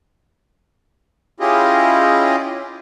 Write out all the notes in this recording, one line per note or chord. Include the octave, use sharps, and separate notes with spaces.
C#4 E4 F4 G4 G#4 D#5